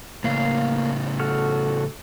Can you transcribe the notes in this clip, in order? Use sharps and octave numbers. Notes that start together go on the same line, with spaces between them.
A2 C#3 A#3 F5
F#4 A4 F6